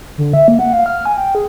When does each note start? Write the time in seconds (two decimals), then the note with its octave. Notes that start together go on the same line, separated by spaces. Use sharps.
0.18 D3
0.33 E5
0.48 A#3
0.59 F#5
0.73 F5
0.86 F6
1.06 G#5
1.17 G5
1.35 G#4